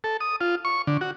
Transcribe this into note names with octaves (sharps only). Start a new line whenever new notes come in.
A4
D#6
F4
C#6
D3
F#4